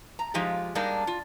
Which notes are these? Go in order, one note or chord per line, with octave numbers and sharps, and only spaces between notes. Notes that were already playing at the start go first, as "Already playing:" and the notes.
A#5
F3 G#3 D#4 F4 G4
G3 G#3 A#3 D4 D#4
F4